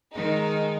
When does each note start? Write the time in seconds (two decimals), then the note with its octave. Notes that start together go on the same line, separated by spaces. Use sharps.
0.12 D#3 G#3 D#4